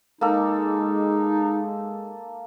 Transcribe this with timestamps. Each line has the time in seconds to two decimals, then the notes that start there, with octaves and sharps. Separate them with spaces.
0.21 G#3 A#3 D#4 A4